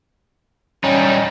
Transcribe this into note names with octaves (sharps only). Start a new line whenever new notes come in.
G3 C#4 D#4